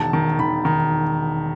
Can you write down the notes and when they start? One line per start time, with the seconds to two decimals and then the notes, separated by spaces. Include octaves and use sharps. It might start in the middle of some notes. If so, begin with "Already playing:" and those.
Already playing: E1 D#3 A5
0.13 D#3
0.39 D#3 B5
0.65 D#3